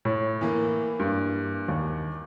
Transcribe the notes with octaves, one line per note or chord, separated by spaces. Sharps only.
A2
E3 A#3
G2
D#2